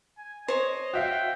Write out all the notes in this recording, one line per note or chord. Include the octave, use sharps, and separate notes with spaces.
G#5
C5 C#5 D#5
F#4 E5 F5 G5